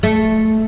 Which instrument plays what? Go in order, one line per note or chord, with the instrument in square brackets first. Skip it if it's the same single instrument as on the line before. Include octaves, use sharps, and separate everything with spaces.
[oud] A3